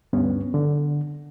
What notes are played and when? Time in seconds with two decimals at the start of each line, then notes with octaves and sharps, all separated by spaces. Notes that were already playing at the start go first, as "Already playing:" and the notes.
0.13 D2 G2 B3 C#4
0.54 D3